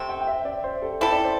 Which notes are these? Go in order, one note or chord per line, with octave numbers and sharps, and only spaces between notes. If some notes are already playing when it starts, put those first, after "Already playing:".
Already playing: C3 A3 C4
G5
G5
E5
D5
C5
A4
C4 E4 A4 C5
D5
C5